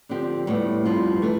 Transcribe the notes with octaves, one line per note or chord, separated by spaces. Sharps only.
D3 F3 C4 G4
A2 G3 B3
G2 F3 C4 F4
E3 A3